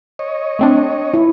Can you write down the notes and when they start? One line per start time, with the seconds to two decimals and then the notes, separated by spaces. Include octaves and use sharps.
0.19 C#5 D#5
0.59 A3 C4 D4
1.14 E4